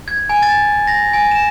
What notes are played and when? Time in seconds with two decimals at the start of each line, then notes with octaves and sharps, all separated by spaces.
0.08 G#6
0.29 G#5
0.43 A6
0.87 A#6
1.13 G#5
1.31 E7